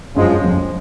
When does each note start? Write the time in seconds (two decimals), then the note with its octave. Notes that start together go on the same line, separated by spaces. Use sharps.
0.16 F#2 C#3 F3 G#3
0.30 F#2
0.44 F2